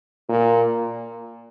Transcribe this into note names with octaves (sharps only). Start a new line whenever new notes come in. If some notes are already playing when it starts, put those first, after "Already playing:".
A#2